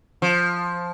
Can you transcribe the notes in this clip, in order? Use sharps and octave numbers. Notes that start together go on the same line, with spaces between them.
F3